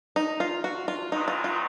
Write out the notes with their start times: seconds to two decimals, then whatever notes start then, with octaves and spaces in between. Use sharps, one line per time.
0.16 D#4
0.40 F4
0.64 F#4
0.88 F4
1.11 G#2 D#3 F#3 B3 D#4
1.28 F4
1.44 F4